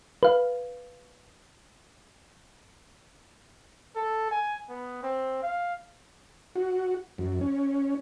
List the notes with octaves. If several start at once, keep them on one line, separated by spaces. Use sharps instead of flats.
B4 F5
A4
G#5
B3
C4
F5
F#4
F#2
C#4